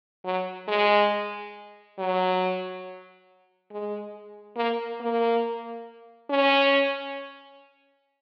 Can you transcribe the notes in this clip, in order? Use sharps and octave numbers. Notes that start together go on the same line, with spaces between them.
F#3
G#3
F#3
G#3
A#3
A#3
C#4